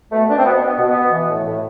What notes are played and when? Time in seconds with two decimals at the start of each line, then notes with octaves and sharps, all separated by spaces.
0.12 B2 A3
0.28 B2 D4
0.37 C4
0.45 B2 B3
0.61 B2
0.67 B3
0.78 B2
0.89 B3
0.95 B2
1.11 E3
1.29 A2
1.45 A2